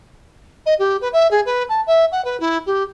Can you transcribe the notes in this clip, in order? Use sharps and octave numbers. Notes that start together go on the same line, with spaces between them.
D#5
G4
B4
E5
G#4
B4
A5
E5
F#5
B4
E4
G4